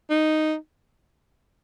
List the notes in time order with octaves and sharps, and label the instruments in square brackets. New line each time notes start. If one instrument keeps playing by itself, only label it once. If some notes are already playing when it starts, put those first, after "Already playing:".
[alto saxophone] D#4